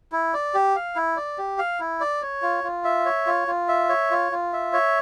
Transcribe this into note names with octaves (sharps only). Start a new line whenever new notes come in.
E4
D5
G4
F5
E4
D5
G4
F5
E4
D5
C#5
F4
F4
E5
C#5
F4
F4
E5
C#5
F4
F4
E5
C#5